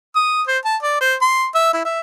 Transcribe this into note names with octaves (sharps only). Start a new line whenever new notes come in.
D#6
C5
A5
D5
C5
C6
E5
E4
E5